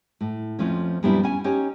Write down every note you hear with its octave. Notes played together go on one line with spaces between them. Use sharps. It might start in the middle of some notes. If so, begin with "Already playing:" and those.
A2
F2 F3 A3 C#4
F#2 A#2 G3 B3 D4 E4
C#4 F#5 G#5
C#4 D#4 G4 C#5